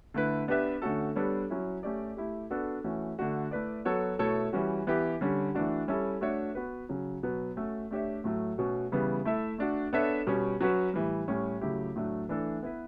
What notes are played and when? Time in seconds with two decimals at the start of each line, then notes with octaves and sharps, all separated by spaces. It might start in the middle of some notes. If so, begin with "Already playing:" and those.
0.14 D3 A3 E4 B4
0.48 B3 D4 G4 B4 E5
0.82 D3 A3 C#4 F#4 A4
1.16 G3 B3 D4 A4 C#5
1.50 F#3 C#4 E4
1.83 A3 C#4 G4 D5
2.17 A3 E4 G4
2.50 B3 D4 F#4 A4
2.84 E3 A3 C#4 F#4
3.19 D3 A3 D4 F#4
3.51 A3 E4 B4 D5
3.85 F#3 B3 F#4 A4 C#5
4.19 B2 A3 E4 A4 C#5
4.53 E3 G3 C#4 F#4
4.87 E3 B3 E4 G4
5.21 D3 G3 C#4
5.55 E3 A3 D4 F#4
5.88 G3 C#4 E4 A4 E5
6.21 A3 D4 F#4 C#5 E5
6.55 B3 F#4 B4
6.89 C#3 F#3 C#4
7.23 B2 F#3 B3
7.56 A3 C#4 F#4 A4
7.91 A3 D4 G4 C#5 E5
8.24 A2 F#3 A3
8.58 B2 A3 C#4 F#4
8.92 C#3 E3 G3 B3
9.25 A3 E4 A4 E5
9.59 A3 D4 F#4
9.93 B3 D4 A4 C#5 E5
10.27 B2 G3 C#4
10.61 F#3 C#4 F#4 B4
10.94 A2 E3 G3
11.28 A2 G3 C#4
11.61 C#3 F#3 A3 E4 G4
11.96 A2 F#3 A3 D4
12.29 E3 A3 D4 A4
12.63 B3 E4 B4